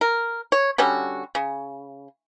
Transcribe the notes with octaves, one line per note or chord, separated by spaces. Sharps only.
A#4
C#5
D3 G3 C#4 F#4
C#3